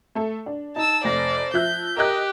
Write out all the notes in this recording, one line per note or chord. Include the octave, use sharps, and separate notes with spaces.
A3 A4
D4
D#4 A5 E6
F1 C5 D5 A#6
F3 E5 F#6 G6
G4 A#4 D#5 F#6